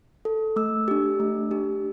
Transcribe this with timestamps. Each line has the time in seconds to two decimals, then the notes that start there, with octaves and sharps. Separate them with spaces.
0.25 A4
0.56 A3 E6
0.88 D4 G4
1.20 A3
1.51 D4 G4